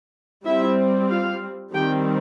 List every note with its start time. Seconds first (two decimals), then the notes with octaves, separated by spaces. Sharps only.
0.45 G3 C4 E4 E5
1.10 F4 F5
1.73 D#3 G3 C4 G4 G5